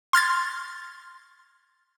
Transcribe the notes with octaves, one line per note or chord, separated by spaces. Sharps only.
C6 F6 G#6 A6